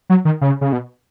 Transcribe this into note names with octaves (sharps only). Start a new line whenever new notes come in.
F#3
D#3
C#3
C#3
B2